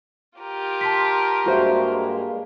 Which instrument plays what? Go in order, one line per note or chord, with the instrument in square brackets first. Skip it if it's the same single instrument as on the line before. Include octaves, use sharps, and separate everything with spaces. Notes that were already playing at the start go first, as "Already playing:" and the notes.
[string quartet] F4 G4 A#4
[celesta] A5 C6 B6
[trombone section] G2 G#3 A#3 [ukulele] F#4 C5 E5